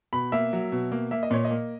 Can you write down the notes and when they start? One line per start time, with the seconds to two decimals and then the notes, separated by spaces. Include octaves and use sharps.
0.13 B2 B5
0.32 A#3 E5
0.53 F#3
0.72 B2
0.92 A#3
1.11 A#3 E5
1.23 D#5
1.31 A#2 C#5
1.45 D#5
1.51 A#3